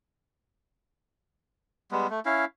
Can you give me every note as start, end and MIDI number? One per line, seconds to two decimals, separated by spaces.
1.92 2.07 55
1.92 2.07 56
1.92 2.07 59
2.10 2.20 57
2.26 2.45 61
2.26 2.45 64
2.26 2.45 77